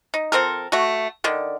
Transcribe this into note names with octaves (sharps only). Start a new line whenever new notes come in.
D#4
F3 C4 A4 A#4
A3 F#4
D3 D#3 D4